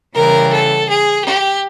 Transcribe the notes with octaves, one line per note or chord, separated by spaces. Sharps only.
C#3 E3 G3 A#4
A4
G#4
G4